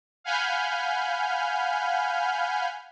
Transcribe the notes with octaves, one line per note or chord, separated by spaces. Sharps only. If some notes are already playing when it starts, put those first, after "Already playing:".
F5 F#5 G#5 B5 F6 G6